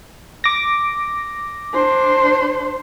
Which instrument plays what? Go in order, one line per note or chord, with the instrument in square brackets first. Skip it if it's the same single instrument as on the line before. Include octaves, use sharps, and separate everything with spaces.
[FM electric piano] D6 A#6
[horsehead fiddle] D4 C5